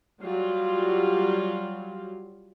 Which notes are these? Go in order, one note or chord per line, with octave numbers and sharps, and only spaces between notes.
F#3 G3 F4